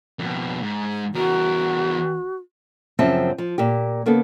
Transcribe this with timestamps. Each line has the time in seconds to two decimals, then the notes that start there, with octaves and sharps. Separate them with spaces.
0.19 F2 B2
0.61 G#2
1.15 E2 F#4 A#4
2.99 F#2 C#3 F3 C4 E5 A5
3.38 F3
3.58 A#2 A#3 G4
4.06 C#3 A#3 B3 A4